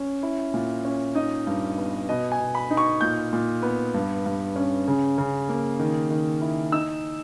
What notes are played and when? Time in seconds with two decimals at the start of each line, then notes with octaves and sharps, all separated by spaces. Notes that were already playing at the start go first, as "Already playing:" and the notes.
Already playing: C#4
0.23 E4
0.54 A#2
0.85 C#4
1.15 D#4 D#5
1.47 G2
1.78 B3
2.09 B2 D#5
2.32 G#5
2.40 B2
2.55 B5
2.70 D#4
2.77 C#6
3.01 A#2 G6
3.33 A#2
3.63 B3
3.94 G2
4.26 G2
4.56 C#4
4.88 C#3
5.18 C#3
5.49 A#3
5.79 D#3
6.10 D#3
6.41 E4
6.72 D#4 E6